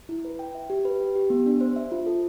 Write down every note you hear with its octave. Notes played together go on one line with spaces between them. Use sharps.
E4
B4
G5
E5
G4
B4
G4
G4
B3
D4
C5
E5
F4
A4